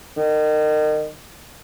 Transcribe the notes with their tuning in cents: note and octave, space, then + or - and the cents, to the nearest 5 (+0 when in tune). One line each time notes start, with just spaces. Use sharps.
D#3 -30